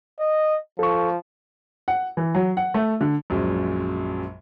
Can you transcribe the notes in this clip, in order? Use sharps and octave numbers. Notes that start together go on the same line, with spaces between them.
D#5
F3 A4 C#6
F#5
E3
F#3
F#5
A3
D3
A#1 F#2 A#2 F#3 G#3